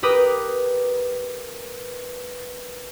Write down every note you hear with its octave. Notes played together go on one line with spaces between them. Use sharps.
G4 A#4 B4 D6 D#6